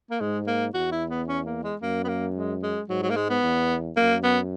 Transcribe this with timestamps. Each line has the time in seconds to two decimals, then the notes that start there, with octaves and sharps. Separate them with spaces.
0.11 A#3
0.20 G#2 G#3
0.47 A#3
0.74 E2 F#4
0.92 E4
1.10 B3
1.28 C#4
1.46 A#3
1.64 G#3
1.81 F#2 A#3
2.04 B3
2.08 A#3
2.36 G#3
2.63 G#3
2.89 G#2 F#3
3.03 F#3
3.10 A#3
3.16 G#3
3.30 B3
3.43 E2
3.96 F#2 A#3
4.24 B3